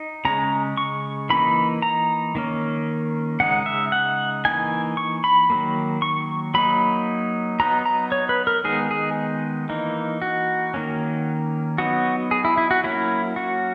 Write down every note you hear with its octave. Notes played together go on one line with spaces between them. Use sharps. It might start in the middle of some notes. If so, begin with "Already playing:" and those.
Already playing: D#4
C#3 G#3 C#4 A#5
C#6
E3 A#3 D#4 B5
A#5
D#3 A#3 C#4
C#3 G#3 D#4 F#5
E5
F#5
E3 A#3 D#4 G#5
C#6
B5
D#3 F#3 A#3
C#6
F#3 A#3 D#4 B5
F#3 B3 D#4 A#5
A#5
C#5
B4
A#4
D#3 G#3 B3 D#4 G#4
G#4
E3 A#3 D#4
F#4
D#3 A#3 C#4
F#3 B3 D#4 F#4
G#4
E4
E4
F#4
F#3 A#3 C#4 E4
F#4